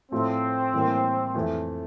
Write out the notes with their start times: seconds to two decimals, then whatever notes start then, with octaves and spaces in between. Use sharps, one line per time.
0.12 A2 F3 A3 C4
0.73 A2 E3 G3 A#3
1.34 F2 E3 A3